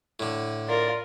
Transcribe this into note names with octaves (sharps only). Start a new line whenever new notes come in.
A2 D3
F4 A#4 D5